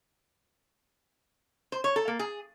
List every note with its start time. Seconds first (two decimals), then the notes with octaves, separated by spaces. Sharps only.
1.72 C5
1.84 C#5
1.96 A4
2.08 A#3
2.19 G#4